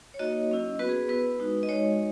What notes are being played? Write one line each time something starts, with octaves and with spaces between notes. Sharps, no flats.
C#5
A#3 D#4 F#4 D#5
F#3 C#4 E4
B3 F#4 B4
G#4
B3 E4 B4
G#3 D#4 F#4
D#5
G#3 D#4 F#4 C#5